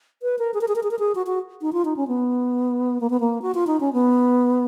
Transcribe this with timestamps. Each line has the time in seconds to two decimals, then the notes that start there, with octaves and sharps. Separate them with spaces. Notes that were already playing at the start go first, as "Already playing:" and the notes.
0.23 B4
0.39 A#4
0.54 G#4
0.61 A#4
0.68 G#4
0.76 A#4
0.83 G#4
0.91 A#4
0.99 G#4
1.15 F#4
1.27 F#4
1.62 D#4
1.73 F4
1.85 D#4
1.96 C#4
2.08 B3
3.01 A#3
3.10 B3
3.20 A#3
3.42 F#4
3.55 F4
3.67 D#4
3.80 C#4
3.93 B3